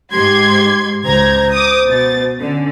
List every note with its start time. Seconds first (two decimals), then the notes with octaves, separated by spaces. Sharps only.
0.12 G#2 G4 C6 G#6
1.04 C#2 C5 A#5 G#6
1.53 D6 D#6
1.88 B2 A6
2.40 D3 C#4